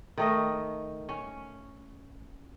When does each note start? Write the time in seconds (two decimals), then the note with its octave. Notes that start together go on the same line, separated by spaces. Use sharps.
0.18 D#3 A3 D#5
1.09 C#4